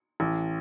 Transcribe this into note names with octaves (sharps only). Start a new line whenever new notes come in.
A1